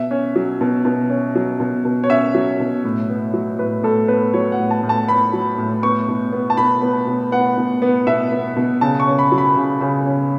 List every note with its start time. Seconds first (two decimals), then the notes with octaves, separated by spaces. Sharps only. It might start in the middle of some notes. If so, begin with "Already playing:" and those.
Already playing: B2 E5
0.11 C#4
0.36 F#3
0.61 B2
0.85 B2
1.10 C#4
1.35 F#3
1.60 B2
1.85 B2
2.04 C#5
2.10 C#4 E5
2.35 F#3
2.60 B2
2.85 A2
3.10 B3
3.34 F#3
3.58 A2 B4
3.83 A2 A4
4.08 B3 B4
4.33 F#3 C#5
4.52 F#5
4.59 A2
4.71 A5
4.83 A2
4.89 A5
5.08 B3 B5
5.33 F#3
5.58 A2
5.83 B3 C#6
6.08 B2
6.32 B3
6.50 A5
6.57 B2 B5
6.82 B3
7.07 B2
7.32 B3 F#5
7.57 B2
7.82 B3
8.07 B2 E5
8.32 B3
8.57 B2
8.81 C#3 A5
9.00 C#6
9.07 C#4
9.19 B5
9.32 F#3
9.38 B5
9.56 C#3
9.81 C#3
10.06 C#4